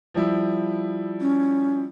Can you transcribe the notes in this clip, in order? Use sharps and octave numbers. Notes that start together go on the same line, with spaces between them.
F3 G3 E4
C#4